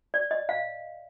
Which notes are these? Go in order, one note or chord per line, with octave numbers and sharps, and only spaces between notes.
D5
D#5
F5